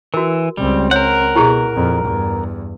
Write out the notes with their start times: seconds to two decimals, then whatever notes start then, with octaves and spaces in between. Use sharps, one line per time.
0.14 E3 F#4 A#4
0.57 C#2 G3 C4
0.91 A#4 C#5 F#5
1.35 B2 E4 G4 G#4
1.72 F2 A#2
2.05 E2 G2